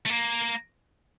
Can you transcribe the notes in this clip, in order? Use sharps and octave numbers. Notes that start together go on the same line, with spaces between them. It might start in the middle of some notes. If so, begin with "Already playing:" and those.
A3
A#3